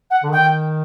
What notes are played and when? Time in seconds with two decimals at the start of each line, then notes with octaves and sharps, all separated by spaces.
0.10 F#5
0.23 D3
0.32 D#3 G5